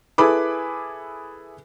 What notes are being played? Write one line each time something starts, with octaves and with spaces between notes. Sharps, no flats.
E4 G#4 A4 B4 B5 D6